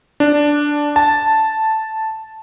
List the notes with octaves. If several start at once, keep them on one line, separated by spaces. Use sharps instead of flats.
D4
A5